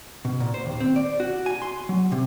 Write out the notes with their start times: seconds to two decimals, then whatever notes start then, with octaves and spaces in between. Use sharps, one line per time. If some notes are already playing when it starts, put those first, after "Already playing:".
0.25 B2
0.40 A#2
0.54 C5
0.66 D#2
0.80 C4
0.96 D5
1.20 F#4
1.46 G#5
1.62 C6
1.89 F#3
2.12 C3